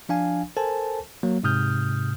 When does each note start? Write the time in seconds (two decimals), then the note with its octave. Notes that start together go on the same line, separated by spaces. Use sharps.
0.09 F3 D4 F5 G#5
0.57 A4 A#4 C5 G#5 A5
1.23 F#3 A#3
1.43 G#2 C3 D#6 F6 G6